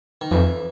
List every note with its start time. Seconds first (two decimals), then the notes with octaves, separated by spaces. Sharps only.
0.21 D#3
0.31 F2 E3